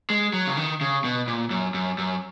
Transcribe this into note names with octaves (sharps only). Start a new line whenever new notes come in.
G#3
F#3
C#3
D#3
C#3
B2
A#2
F#2
F#2
F#2